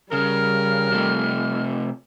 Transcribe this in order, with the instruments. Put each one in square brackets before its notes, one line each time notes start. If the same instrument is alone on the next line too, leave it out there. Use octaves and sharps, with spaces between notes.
[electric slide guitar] C#3 [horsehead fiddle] G3 [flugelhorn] A#4 [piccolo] F6
[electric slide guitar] C3 A3